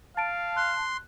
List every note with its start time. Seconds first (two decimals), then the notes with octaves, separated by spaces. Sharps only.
0.17 F5 A5 A6 D7
0.57 C6 F#6